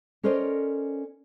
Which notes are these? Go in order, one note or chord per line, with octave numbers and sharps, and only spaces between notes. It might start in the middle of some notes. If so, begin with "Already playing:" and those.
C#4 A4 A#4 C5 D5 D#5